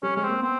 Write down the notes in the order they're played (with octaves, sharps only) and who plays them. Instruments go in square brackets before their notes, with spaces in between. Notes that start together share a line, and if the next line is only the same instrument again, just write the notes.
[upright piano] G3 [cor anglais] C#4
[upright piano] G#3 [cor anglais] C#4
[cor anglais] C4
[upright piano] A#3
[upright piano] B3 [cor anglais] C4